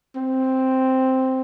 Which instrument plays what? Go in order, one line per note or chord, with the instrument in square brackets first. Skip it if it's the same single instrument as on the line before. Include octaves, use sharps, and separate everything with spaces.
[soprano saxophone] C4